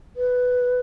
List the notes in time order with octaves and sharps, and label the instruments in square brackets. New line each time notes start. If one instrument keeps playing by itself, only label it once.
[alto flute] B4